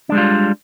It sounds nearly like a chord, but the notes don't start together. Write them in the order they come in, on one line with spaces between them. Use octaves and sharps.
D4 G#3 G3 F4